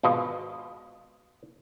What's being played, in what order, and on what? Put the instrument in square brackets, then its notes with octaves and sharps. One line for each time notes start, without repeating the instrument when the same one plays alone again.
[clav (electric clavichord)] G#1 B2 F4 D#5